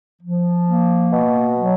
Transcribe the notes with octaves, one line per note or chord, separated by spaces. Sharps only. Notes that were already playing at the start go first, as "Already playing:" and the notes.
F3
A#3
B2
F#3